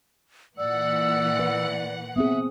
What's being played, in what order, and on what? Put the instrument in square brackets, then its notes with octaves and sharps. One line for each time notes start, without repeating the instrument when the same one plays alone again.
[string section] A#2 E3 F#5 [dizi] D5 [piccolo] E6
[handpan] B4
[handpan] B3 C4 G#4 [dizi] E5 [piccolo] D#6